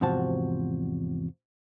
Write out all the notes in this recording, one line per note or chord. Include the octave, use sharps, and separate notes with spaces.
E2 G#2 C3 F3 F#4 A5